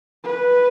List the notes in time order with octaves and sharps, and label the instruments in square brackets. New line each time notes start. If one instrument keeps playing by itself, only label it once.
[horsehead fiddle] B4